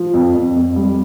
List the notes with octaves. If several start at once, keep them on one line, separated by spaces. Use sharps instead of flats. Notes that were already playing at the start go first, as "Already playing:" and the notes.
Already playing: F3
F2
F2
F2
G3